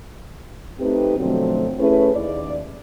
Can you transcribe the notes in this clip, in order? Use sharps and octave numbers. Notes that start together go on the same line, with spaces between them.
A3 C4 D#4 G4 B4
B2 D3 F3 F#3 A3 C4
A3 C#4 E4 G#4 B4
D#2 D5